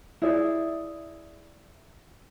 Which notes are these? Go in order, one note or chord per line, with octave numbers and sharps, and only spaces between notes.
E4 G#4 D5 E5